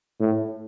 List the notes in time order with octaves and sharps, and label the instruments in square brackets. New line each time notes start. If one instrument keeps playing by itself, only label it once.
[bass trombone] A2